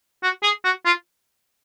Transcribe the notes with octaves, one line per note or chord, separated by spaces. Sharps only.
F#4
G#4
F#4
F4